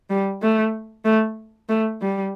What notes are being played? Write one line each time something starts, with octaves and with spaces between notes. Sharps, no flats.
G3
A3
A3
A3
G3